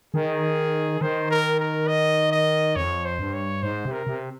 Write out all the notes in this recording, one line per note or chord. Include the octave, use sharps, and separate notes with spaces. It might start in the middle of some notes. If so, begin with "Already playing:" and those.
D#3 G#4
D#3 C5
A#4
A#4
D#5
D#5
F2 C#5
C5
G2
C#5
G#2 C5
C3
A#4
C3